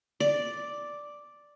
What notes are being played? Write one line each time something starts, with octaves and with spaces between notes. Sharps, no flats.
D5